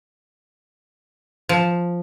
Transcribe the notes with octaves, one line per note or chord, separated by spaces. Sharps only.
F3